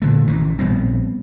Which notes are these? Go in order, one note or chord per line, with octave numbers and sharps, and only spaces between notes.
A#2 D3 A3
A1 D#3 E3
A#1 G3 B3 C4